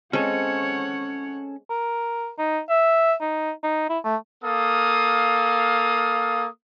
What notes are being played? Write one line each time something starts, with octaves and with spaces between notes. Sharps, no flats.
G#3 C4 C#4 A4 C#5 F#5
A#4
D#4
E5
D#4
D#4
E4
A3
A#3 A4 F5 D#6